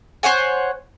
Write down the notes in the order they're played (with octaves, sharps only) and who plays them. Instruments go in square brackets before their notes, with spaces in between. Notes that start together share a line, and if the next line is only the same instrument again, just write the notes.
[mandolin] C5 C#5 F#5 G#5